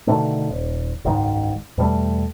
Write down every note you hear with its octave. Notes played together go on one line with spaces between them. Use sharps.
B2 D3 D#3 A3
D#1
F#1 C#2 G#2 D#3
E2 B2 G3 A3